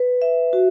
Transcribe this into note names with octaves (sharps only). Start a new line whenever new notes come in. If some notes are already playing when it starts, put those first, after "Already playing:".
Already playing: B4
E5
F#4